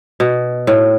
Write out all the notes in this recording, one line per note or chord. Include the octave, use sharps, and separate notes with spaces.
B2
A2